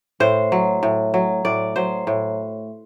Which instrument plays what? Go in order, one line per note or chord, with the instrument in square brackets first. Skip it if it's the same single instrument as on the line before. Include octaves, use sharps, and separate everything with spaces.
[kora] A2 C5
F#3
A2
F#3
A2 D5
F#3 C5
A2